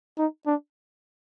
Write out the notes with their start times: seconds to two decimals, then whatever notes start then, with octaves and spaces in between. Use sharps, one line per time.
0.18 D#4
0.46 D4